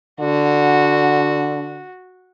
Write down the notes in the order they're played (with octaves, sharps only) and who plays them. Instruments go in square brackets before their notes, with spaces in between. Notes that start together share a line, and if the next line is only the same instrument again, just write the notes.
[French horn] D3 [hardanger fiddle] F#4